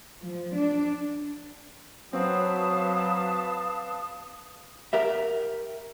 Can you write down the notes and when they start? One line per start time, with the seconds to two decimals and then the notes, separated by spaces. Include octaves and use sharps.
0.23 F3
0.56 D4
2.13 F#3 C4 F#4 B4 F5 A5 D#6
4.93 G4 A#4 E5